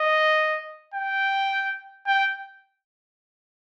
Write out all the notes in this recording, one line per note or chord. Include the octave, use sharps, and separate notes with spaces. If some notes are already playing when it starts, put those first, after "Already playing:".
Already playing: D#5
G5
G5